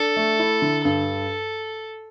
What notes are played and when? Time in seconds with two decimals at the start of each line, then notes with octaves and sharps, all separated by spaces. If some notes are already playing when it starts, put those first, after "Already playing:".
Already playing: D4 A4
0.17 A3
0.40 E4
0.62 D3
0.85 G2 A4